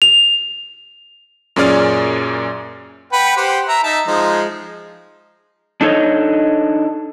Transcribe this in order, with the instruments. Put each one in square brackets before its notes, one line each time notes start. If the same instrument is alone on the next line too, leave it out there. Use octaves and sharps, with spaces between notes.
[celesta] F7
[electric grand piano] F#2 A#2 C#4 G#4 D5 F6
[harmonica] B4 F#5 G5
G4 C5 F#5
E5 A#5
D#4 E5 A5
F3 G#3 D#4
[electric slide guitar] D4 D#4 A4 C5 C#5 D#5